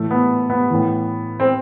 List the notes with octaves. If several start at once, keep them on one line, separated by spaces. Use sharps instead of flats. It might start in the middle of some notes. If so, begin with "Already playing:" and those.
Already playing: A2 E3 A3
B3
B3
A2 E3
C4